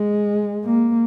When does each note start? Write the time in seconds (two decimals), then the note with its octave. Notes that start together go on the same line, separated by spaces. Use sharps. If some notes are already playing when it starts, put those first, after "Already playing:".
Already playing: G#3
0.65 A#3